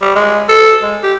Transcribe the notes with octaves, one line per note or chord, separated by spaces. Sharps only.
G3
G#3
A4
G#3
G4